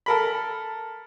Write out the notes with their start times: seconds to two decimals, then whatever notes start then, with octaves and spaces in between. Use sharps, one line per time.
0.06 A4 A#4 B5